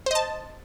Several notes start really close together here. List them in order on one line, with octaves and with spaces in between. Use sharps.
C5 D#5 A5